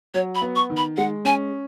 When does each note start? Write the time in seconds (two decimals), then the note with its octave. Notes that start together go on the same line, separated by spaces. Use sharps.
0.14 F#3 C#5
0.35 B5
0.42 B3
0.56 C#6
0.70 D#3
0.77 B5
0.97 G#3 F#5
1.25 C#4 G#5